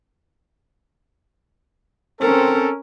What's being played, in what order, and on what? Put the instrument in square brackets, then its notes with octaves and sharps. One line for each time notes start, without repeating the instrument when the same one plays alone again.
[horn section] C4 A4 [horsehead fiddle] C#4 A#4